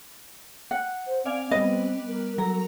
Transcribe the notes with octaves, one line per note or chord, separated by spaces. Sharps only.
F#5
C5
C4 D5 F5 G#5
G3 B3 C4 D#5
A#4
F#3 A4 A#4 A#5